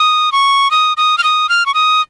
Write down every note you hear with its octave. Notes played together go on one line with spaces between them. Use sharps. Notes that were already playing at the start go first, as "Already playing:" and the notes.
Already playing: D#6
C#6
D#6
D#6
F6
D#6
F6
C#6
D#6